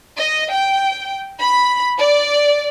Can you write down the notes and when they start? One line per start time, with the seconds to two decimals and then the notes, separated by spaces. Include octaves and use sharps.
0.17 D#5
0.52 G5
1.40 B5
1.98 D5